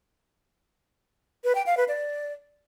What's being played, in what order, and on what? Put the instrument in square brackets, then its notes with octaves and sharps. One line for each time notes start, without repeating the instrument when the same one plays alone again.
[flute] B4
G5
F5
B4
D5